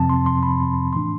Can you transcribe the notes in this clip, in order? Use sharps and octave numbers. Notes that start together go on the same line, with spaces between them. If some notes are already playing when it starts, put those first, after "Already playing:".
Already playing: F2 C3 F3 C4 A5
C6
C6
B5
A2 E3 A3 D4 C6